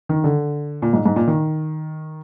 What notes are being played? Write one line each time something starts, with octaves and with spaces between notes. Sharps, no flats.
D#3
D3
A#2
G#2
G#2
A#2
D#3